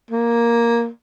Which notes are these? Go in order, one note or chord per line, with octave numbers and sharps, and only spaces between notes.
A#3